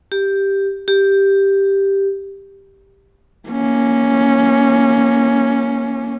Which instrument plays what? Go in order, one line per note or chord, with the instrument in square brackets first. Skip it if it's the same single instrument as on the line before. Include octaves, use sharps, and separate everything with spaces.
[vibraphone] G4
G4
[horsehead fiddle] A#3 C#4